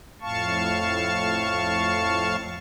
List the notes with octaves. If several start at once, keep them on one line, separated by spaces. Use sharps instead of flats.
F2 A2 F5 A5 C#6